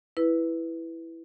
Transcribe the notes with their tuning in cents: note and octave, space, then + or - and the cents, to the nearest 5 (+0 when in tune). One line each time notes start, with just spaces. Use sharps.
E4 +0 B4 +0